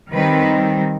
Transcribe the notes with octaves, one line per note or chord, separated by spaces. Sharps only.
D#3 G3 C4 B4